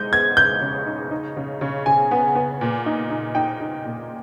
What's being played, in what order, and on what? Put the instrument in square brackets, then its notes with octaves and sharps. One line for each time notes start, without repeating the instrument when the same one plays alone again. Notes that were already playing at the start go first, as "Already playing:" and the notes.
Already playing: [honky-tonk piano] G#3 D#4 [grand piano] G6
[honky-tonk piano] B3 [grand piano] G#6
[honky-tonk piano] C#3 [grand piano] G6
[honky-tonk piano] C#3
D#4
D#4
C#3
C#3
[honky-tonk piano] C#3 [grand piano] G#5
[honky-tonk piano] B3
B3
A#2
D#4
D#4
[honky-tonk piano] D#4 [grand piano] G5
[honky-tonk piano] D#4
A#2